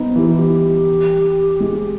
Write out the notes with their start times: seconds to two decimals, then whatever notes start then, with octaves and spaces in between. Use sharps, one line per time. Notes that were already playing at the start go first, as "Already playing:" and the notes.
Already playing: B3 D#4
0.16 E3 G4
0.27 E4
0.38 G4
1.60 G#3